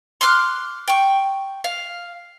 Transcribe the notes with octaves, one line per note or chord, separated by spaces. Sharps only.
C6 D6 F6 F#6
G5 C#6
F5